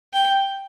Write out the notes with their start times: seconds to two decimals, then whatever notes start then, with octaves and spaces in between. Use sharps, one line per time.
0.13 G5